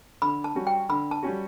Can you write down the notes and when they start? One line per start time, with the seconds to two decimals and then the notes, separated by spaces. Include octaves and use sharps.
0.22 D3 B5
0.44 A5
0.55 G3 C#4 F#4
0.67 G5
0.89 D3 B5
1.11 A5
1.23 G3 C#4 F#4